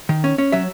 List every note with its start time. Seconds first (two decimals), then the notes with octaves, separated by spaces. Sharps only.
0.09 D#3
0.24 C#4
0.38 C#4
0.52 F#3 E5